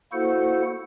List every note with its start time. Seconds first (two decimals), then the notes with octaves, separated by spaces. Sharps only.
0.12 A#3 E4 F#4 A4 C5 F#5